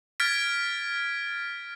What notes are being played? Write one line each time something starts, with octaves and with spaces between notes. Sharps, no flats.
F6 G#6 A6 B6 D7